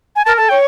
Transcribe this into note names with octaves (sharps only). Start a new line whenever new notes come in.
G#5
A#4 A5
A4 A5
C#5 G5